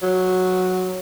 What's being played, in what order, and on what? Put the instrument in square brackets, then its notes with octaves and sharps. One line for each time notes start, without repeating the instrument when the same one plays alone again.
[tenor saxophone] F#3